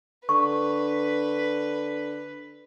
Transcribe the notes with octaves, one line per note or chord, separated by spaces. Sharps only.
D3 B4 C#6